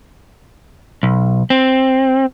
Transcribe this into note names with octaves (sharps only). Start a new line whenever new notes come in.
B1
C4